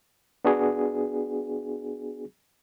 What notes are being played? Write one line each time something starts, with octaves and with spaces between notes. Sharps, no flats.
B3 D4 F#4 G#4